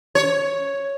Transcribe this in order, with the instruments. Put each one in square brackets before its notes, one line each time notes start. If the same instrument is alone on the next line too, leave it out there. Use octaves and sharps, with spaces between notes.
[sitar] C#5